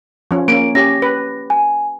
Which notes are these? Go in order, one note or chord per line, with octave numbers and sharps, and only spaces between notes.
F3 C#4
A#3 C#4 D7
C#4 G4 A#6
B4
G#5